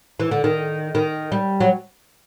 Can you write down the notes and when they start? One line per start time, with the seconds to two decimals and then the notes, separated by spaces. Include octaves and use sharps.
0.20 E3
0.31 D3
0.44 D#3
0.95 D#3
1.32 G3
1.60 F#3